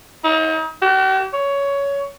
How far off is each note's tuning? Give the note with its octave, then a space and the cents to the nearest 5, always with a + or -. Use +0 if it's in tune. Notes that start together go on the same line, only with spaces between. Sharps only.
D#4 +40
G4 -45
C#5 +15